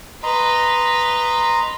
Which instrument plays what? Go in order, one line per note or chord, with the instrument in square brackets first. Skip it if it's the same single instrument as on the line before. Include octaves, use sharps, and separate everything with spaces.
[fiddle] B4 [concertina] D#5 A#5 C6